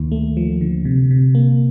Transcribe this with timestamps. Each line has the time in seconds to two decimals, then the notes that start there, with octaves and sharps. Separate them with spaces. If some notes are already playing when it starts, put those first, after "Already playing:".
Already playing: D2 D#3 A#3
0.12 A3
0.37 F3
0.61 D3
0.85 C3
1.11 C3
1.35 A#3